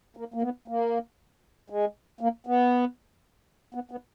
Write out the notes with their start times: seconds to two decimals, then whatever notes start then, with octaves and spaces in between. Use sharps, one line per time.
0.17 A#3
0.34 A#3
0.42 B3
0.68 A#3
1.70 G#3
2.21 A#3
2.47 B3
3.74 B3
3.91 B3